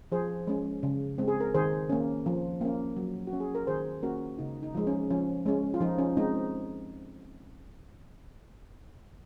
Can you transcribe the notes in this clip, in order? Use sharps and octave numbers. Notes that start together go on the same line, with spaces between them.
F3 G#4 C5
G#3 C#4
C#3
G#3 C4
G#4
A#4
D#3 G#4 C5
A#3 C#4
F3
A#3 C#4
F#3
F#4
C#4
G#4
A#4
D#3 G#4 C5
A#3 C#4 F#4 A#4
C#3 D#4
D#4
F3 G#3
C#4
F3 C#4
G#3 C#4
F4
F3 D#4
C#4
G#3 C4 D#4